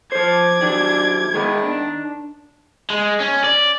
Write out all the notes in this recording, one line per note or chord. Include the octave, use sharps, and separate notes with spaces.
F3 C5 D6 G#6
D#3 F#3 D4
D#3 G#3 B3 B4
D4
G#3
C#4
D5